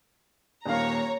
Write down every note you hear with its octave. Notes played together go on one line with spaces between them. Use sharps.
D#1 A#3 C#5 F5 A#5